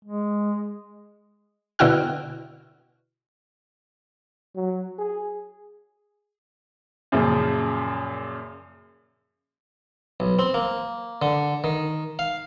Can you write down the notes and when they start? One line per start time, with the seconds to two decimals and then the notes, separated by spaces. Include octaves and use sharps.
0.05 G#3
1.79 B2 D3 E4 F#4 G5 F6
4.55 F#3
4.99 G#4
7.12 F#2 A#2 C#3 F3
10.20 B1
10.39 C4
10.54 A#3
11.22 D3
11.64 D#3
12.19 F5